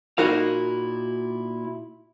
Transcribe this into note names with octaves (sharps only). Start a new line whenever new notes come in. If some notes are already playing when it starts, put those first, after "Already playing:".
A#2 D#4 E4 F#4 A#4 F5